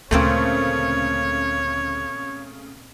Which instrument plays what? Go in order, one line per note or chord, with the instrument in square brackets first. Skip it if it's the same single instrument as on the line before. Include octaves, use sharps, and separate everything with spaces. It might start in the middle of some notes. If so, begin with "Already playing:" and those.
[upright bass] D2 [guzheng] A#2 A#3 C4 [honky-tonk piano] C#3 A3 [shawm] C#5